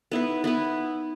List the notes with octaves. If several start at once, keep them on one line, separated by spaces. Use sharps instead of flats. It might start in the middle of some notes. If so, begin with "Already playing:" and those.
B3 D#4 E4 B4
B3 E4 B4